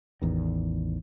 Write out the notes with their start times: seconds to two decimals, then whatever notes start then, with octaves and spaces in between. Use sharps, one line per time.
0.22 A1 E2 D#3